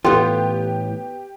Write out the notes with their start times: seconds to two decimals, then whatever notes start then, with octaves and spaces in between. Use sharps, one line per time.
0.04 A2 E3 B3 F4 G4 A4 G5 C6